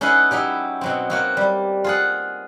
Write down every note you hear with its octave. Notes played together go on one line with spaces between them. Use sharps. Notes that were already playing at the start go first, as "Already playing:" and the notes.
C#4 D#4 E4 G#4 B4 F#5
F#3 D#4 E4 G4
B2 F#3 C4
F#3 A#3 F#4
G3
F4 G#4 F#5